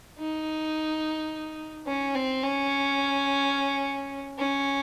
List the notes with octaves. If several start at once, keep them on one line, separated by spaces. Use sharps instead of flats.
D#4
C#4
C4
C#4
C#4